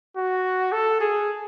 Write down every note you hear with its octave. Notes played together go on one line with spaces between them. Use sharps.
F#4
A4
G#4